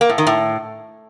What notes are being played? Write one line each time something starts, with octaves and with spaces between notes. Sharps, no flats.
A#3
A2
D#3
A2